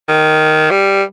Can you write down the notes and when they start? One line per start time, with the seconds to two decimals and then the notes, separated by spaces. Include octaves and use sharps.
0.09 D#3
0.71 G3